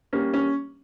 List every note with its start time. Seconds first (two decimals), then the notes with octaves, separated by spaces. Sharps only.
0.13 G3 A#3 C#4
0.34 C#4